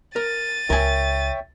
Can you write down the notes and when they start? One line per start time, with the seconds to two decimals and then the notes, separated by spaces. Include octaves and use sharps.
0.16 A#4 A6 D#7
0.70 C#2 A#4 C#5 E5 G5 G#5